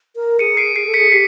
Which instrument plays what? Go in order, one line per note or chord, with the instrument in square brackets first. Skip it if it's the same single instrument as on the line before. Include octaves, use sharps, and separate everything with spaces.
[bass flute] A#4
[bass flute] G#4 [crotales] C#7 D#7
[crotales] C7 D7
[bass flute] G#4 [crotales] C7
[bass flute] A4
[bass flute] G#4 [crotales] B6 C#7
[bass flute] G4 [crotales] C7